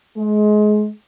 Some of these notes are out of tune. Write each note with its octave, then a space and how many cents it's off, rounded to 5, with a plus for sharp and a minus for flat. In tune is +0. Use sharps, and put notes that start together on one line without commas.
G#3 +25